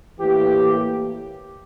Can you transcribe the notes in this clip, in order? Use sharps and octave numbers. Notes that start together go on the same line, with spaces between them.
A2 E3 A#3 G4